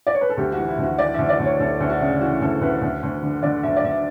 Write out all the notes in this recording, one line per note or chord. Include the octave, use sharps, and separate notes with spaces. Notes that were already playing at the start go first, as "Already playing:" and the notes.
D5
C#5
B4
A4
D2 G4
F#4
E3
E4
D2
F#4
E3 D5
D2 E5
D5
D2
C#5
D2 A4
D2
F#4
C#3
E3 F#4
D2 A4
D2 B4
D2
D2
D3
D3 D5
D2 E5
D5
D2 E5